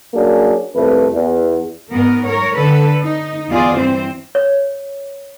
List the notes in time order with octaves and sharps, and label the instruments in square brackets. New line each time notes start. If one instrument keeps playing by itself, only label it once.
[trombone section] F#3 A#3 C#4 D4 G#4
C2 F2 A3 B4
E2
[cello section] G#2 B3 A#4
A#4 C#5
D3 A4 B4
D#4
E2 F4 G#4 D5
G2 E3 C4 C5
[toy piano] C#5